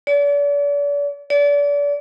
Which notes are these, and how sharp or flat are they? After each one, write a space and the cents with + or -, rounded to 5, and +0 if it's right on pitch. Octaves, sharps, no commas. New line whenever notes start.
D5 -40
D5 -35